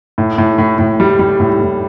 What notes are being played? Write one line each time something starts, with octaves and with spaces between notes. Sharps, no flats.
A2
A2
A2
A2
G3
G3
A2
A2